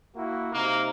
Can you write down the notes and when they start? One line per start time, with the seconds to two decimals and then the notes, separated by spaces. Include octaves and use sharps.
0.16 A#3 E4 F#4
0.53 C3 A#3 D#4